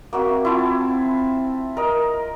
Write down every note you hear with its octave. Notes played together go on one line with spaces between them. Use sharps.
A#3 C4 F#4 E5
E4 F4 A5
A#4 D#5